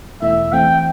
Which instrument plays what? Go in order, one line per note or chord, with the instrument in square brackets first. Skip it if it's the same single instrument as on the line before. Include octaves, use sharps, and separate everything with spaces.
[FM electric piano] E2 B2 A3 E4 [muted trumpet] E5
[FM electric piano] E3 A3 C4 [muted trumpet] G5